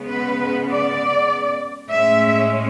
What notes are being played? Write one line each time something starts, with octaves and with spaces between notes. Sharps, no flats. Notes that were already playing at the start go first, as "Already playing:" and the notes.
Already playing: C#3 G#3 B3
B4
D5
A2 G#3 C#4 E5